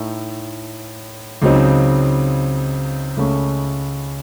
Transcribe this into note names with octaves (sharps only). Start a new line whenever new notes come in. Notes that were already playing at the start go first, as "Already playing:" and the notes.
Already playing: A2 A3 D#4
C#2 C#3 F#3 C4 D#4
C#2 C#3 A3 C#4